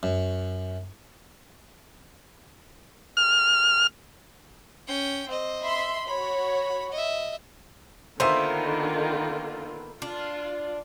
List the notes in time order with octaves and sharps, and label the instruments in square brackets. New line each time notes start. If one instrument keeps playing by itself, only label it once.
[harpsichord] F#2
[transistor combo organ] F6
[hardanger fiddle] C#4 G5
C4 D#5
[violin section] E5 B5 C6
[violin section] F#4 C#5 [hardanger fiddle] B5
[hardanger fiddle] D#5 E5
[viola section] D3 D#3 F4 [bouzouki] A#3 B3 [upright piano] C5 E5 C6
[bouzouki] D4 [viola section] F4